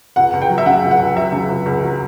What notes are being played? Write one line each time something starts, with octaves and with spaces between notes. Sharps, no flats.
C#2 F#5
C#2
G5
F#3
E5
C#3 F#5
C#2
F#5
C#2
F#3 E5
C#3
C#2
C#2
F#3